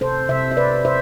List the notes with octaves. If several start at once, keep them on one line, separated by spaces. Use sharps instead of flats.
C3 A4 C5
C3 C5 E5
E5
C3 B4 D5
C3 C5 E5